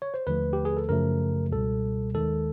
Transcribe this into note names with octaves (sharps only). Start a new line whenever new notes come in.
C#5
C5
D#2 D3 F3 A3 B4
G4
G#4
A4
F#2 C#3 F3 A3 A#4
C#2 B2 G3 A4
D#2 D#3 G#3 A4